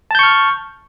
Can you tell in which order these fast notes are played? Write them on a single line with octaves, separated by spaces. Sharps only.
A5 G6 C#6 F6